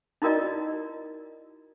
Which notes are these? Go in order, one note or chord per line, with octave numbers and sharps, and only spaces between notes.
D#4 E4 F#4 A#4 D5 D#5